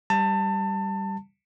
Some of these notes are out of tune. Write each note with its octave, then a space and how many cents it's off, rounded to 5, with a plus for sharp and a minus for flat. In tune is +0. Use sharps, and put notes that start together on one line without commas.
G3 +0 A5 +25